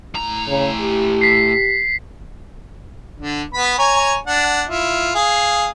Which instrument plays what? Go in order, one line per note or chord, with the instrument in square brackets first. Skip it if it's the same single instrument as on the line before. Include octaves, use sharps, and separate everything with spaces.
[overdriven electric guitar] A2 A#5
[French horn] C#3
G4
[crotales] B6 C7
[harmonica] D3 D4
B3 B5
C#5 G#5 A#5
D4 F#5
E4 F4
G#4 F5